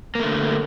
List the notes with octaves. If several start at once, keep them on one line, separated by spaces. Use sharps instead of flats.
D3 A3 A#3